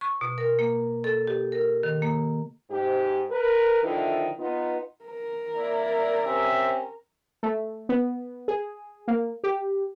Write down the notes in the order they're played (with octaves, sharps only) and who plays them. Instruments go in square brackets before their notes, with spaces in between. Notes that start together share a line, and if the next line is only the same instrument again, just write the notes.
[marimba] C#6
B2
A#4
A#3
A4
G4
A#4
D#3
A#3
[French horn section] G#2 G4
A#4 B4
D3 D#3 F3 E4
B3 D#4 F4
[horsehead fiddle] A#4
[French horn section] A#3 E4 D5
[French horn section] C4 C#4 G4 [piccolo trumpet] E5
[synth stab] A3
B3
G#4
A#3
G4